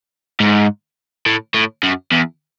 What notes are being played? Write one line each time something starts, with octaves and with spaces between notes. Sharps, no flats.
G#2
A2
A2
F#2
E2